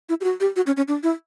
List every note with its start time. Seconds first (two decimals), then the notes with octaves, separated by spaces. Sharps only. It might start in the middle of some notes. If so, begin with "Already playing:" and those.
0.09 E4
0.21 G4
0.24 F#4
0.40 G4
0.56 F#4
0.67 C#4
0.77 C#4
0.88 D4
1.03 E4